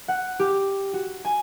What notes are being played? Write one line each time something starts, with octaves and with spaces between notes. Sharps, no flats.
F#5
G4
F#4
G#5